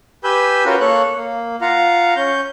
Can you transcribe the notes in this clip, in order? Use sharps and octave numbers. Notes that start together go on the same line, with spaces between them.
G4 B4 G#5 B5 E6 G6
C#4 F4 F#4 A#4 B4
A#3 A4 C#5 F#6
A#3
F4 F5 F#5 A#5
C#4 G6